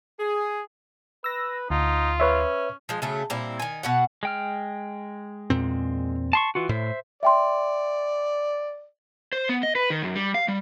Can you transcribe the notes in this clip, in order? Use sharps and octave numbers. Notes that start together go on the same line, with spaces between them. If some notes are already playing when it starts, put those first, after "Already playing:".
G#4
B4 E6 A#6
D2 D#4 F4
C#4 B4 C#5 E5
F3 G#3
C#3 F#3 A3
A#2 G3 C4 E4
D#3 G#5
B2 F#4 F#5
G#3 G5 F6
E2 A#2 C4
A5 C6 C#6
E3 F4 F#4
A2 C5 E5
D5 E5 G5 C6
C5
B3
D#5
B4
D#3
F#2
G3
F5
G3